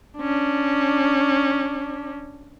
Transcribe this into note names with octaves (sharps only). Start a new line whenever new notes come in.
C#4 D4